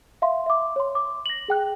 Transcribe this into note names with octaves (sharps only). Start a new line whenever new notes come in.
E5 F5 C6
E5 D6
C#5 C6
D6
A#6 F#7
G#4 G5 F#6